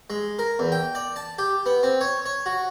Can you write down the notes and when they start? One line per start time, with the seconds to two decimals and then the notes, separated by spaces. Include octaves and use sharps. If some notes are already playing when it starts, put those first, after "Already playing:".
0.10 G#3
0.39 A#4
0.59 E2
0.72 G5
0.95 D5
1.16 A5
1.38 G4
1.66 B3
1.83 C4
2.01 C#5
2.26 C#5
2.46 F#4